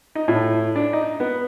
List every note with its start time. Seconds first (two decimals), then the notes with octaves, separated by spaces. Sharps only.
0.15 D#4
0.28 A2
0.76 D4
0.93 D#4
1.20 B3